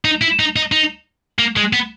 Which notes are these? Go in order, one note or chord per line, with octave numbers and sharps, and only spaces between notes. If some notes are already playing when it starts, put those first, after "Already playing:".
D#4
E4
D#4
D#4
D#4
A#3
G#3
B3